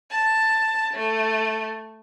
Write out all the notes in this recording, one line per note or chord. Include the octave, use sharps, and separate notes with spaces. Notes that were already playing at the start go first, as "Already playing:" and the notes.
A5
A3